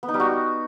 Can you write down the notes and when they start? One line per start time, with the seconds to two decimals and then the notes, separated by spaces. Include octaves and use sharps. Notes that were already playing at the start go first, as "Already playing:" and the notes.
0.03 B3
0.08 D#4
0.14 G3
0.20 F#4